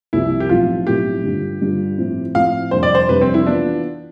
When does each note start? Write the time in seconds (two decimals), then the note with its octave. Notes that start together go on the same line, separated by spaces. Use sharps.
0.13 C2 C3 F3 E4
0.40 G4
0.49 B1 A2 F3 C4 F4
0.87 B1 A2 F3 C4 G4
1.24 G2 D3 G3 D4 F4
1.61 G2 D3 G3 D4 F4
1.98 A2 F3 C4
2.35 A2 F3 C4 F5
2.71 F2 C3 G3 D4 C5
2.83 D5
2.95 C5
3.09 F2 C3 G3 D4 B4
3.21 C4
3.34 E4
3.47 E3 B3 D4 F4